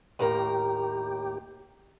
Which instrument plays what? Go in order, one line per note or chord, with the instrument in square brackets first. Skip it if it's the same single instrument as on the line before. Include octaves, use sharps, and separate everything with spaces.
[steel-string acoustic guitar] D#2 A2 A#4 [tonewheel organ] G4